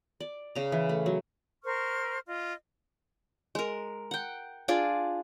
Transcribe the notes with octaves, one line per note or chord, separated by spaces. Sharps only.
D5
C#3 A#5
E3
A3
F#3
A#4 C5 C#6 F6
F4 D#5
G#3 A#4
F#5 G5
D4 F4 G#4 D5